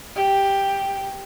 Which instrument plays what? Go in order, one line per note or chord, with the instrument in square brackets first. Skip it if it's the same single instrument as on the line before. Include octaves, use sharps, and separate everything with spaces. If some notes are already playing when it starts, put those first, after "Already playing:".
[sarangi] G4